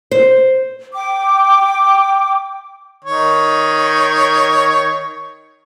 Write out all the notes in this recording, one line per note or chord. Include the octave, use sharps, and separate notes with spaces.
C5
G5 D6
D#3 C#5